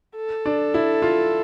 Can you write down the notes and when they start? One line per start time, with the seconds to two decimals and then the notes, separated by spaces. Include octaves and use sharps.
0.16 A4
0.46 D4
0.74 E4
1.02 F4